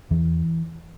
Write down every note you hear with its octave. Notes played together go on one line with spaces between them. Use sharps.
E2 E3